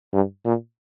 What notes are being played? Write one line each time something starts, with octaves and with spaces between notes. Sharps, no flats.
G2
A#2